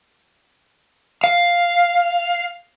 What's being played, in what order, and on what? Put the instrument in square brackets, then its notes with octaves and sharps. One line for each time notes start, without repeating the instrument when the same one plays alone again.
[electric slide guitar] F5